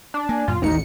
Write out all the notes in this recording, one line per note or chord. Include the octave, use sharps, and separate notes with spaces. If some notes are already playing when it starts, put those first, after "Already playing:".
D4
A#3 G#5
F#2 A#2 F4
A1 D#2 D#4 C#7